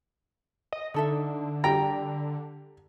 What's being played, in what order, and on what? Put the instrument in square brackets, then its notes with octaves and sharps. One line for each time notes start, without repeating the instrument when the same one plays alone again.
[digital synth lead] D#5
[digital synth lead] D3 [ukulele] D#4 A4 E5
[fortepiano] G3 A#5 [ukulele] G5